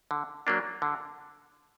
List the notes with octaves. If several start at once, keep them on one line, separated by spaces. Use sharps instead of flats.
D3
F#3 A#3 D4
D3